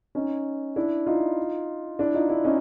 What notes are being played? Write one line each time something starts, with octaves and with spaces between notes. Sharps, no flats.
C#4 D#4
D4 E4
D#4 F4
D4 E4
D#4 F4
D4 E4
C#4 D#4